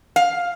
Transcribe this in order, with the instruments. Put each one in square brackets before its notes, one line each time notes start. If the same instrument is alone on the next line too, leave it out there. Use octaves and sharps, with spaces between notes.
[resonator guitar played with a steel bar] F5